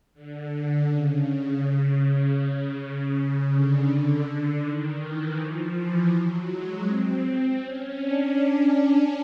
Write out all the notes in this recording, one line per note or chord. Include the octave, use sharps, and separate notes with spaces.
D3
C#3
C#3
C#3
D3
D#3
E3
F3
E3
F#3
G#3
C4
C4
C#4
D4